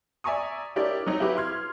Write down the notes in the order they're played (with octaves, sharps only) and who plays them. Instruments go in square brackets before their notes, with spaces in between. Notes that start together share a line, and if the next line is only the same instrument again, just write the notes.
[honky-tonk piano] D5 E5 G#5 A#5 C#6 D#6
D4 E4 G4 A#4 C#5 D5
F#3 C4 D#4 C#5
E4 F#4 G4 B4
C6 F6 G#6